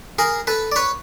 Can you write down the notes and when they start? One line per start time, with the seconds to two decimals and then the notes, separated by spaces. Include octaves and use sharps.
0.19 G#4 A#4
0.47 A4 B4
0.72 D5
0.76 B4 C#5